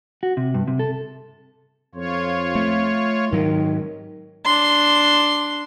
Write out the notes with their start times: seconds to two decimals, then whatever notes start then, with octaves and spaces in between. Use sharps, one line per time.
0.23 F#4
0.37 C3
0.54 G2
0.68 C3
0.79 A4
1.95 F2 F4 C#5
2.55 A3
3.32 G#2 D#3 F#3 G#3
4.45 D4 C6